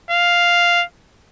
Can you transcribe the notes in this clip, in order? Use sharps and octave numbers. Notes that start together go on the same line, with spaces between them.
F5